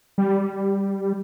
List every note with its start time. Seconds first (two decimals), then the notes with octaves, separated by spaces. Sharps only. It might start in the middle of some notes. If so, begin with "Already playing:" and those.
0.18 G3